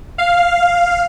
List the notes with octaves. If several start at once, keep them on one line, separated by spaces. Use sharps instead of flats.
F5